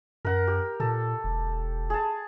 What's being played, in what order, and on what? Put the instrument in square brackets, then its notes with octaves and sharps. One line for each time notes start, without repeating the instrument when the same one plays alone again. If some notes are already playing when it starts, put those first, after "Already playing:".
[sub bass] F#2 [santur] A#4 F#5
[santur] G4
[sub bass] A#2 [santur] A4
[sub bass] E1
[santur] G#4 A5